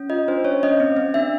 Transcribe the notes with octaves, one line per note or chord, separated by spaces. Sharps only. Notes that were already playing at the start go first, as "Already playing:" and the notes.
Already playing: C#4
F4 D#5
D4 C5
C#4 C#5
C#4 D#5
C4
C4
D4 E5